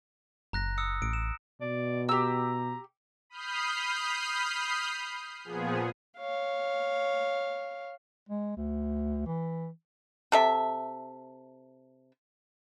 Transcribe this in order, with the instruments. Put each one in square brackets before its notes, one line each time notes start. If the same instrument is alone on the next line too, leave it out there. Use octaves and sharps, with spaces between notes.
[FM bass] F#1 [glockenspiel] A#5 F#6 A#6
[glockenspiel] D#6 E6 C#7
[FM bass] A1 [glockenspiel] D7
[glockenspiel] E7
[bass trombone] B2 [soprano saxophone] D5
[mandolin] G4 E6 [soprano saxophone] A#5
[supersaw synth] B5 D#6 F6 G6 C7
A#2 F3 B3 G#4
[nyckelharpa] C#5 F5
[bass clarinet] G#3
D2
E3
[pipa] C3 A4 E5